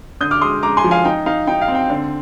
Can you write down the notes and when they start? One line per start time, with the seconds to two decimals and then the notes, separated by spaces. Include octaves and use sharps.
0.21 D3 D#6 G6
0.31 D6 F6
0.41 G#3 C6 D#6
0.63 G#3 A#5 D6
0.77 G#5 C6
0.84 F3
0.91 F5 G#5
1.05 D#4 G5
1.26 D#4 F5
1.47 D#4 G5
1.62 F5
1.68 C4
1.75 G5
1.90 D3